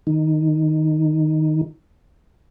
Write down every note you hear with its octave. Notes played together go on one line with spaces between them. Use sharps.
D#3 D#4